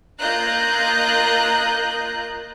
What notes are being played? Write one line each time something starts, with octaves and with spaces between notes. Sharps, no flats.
A#3 F4 D#5 A#5 F#6 G6